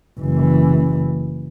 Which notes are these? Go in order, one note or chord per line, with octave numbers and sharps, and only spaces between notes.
F#1 E3